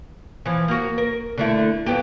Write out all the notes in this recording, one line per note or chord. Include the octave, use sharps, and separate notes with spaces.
E3 F3
A#3 F#4
A#4
D3 A3 E4
F2 B3 G4